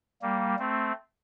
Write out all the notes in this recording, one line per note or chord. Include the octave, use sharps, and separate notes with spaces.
G3 A#3
A3 C4